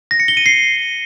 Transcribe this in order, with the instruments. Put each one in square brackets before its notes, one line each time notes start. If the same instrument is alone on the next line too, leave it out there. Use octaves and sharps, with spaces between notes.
[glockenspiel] A#6
C#7
G7
D#7
C7